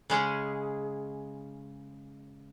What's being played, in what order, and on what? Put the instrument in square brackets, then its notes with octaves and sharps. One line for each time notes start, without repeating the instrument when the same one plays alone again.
[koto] C#3 G#3 C#4 G#4